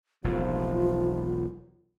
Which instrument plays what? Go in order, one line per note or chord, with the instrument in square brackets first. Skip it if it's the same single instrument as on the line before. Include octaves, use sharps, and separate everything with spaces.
[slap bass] E1 B1 A2 [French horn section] C3 D#3 F3 [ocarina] F4